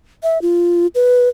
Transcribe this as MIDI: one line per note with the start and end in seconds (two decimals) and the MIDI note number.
0.23 0.41 76
0.42 0.87 65
0.95 1.29 71